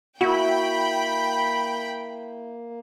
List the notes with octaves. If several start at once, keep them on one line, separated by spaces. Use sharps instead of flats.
A#3 E4 F#4 G5 B5